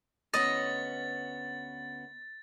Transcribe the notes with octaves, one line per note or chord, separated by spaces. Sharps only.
D2 B3 C#4 D#5 A6